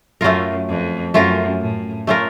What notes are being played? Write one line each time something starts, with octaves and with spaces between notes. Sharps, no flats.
F#2 A3 C#4 F4 A#4
F2
F#2 A3 C#4 F4 A#4
A2
A3 C#4 F4 A#4